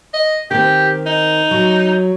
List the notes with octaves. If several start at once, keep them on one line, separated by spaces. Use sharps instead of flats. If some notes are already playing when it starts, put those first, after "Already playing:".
D#5
D#3 C4 G4
D#4
F#3